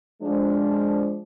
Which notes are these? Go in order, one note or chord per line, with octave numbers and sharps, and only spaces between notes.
F3 G#3 D4